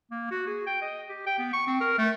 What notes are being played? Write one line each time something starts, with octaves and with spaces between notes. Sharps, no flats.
A#3
F#4
G#4
G5
D#5
G4
G5
B3
C#6
C4
A#4
A3